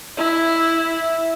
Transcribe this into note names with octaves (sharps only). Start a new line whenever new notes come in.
E4